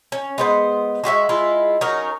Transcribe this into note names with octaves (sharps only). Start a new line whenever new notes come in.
C#4
G#3 B3 C5
G#3 F#4 G4 E5
G#3 E4 F4
F#3 C#4 D#4 A#4